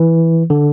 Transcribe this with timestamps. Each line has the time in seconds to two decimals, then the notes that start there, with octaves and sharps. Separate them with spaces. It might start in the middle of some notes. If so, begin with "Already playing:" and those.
Already playing: E3
0.50 D3